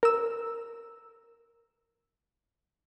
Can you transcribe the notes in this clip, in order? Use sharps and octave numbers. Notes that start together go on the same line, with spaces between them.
A#4 E6